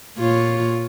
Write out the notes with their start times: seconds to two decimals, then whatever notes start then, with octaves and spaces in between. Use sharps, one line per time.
0.18 A#2 F4 C#5